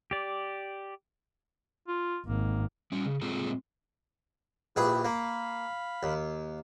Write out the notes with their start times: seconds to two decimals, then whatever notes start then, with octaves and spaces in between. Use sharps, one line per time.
0.11 G4 D5
1.88 F4
2.25 G#1 A#3
2.92 G3 C#4
3.05 C#3
3.22 A#2 G#3 C4 F4 A4 A#5
4.76 A#1 E4 G4 G#4 B4
5.05 A#3 F5 B5
6.03 D#2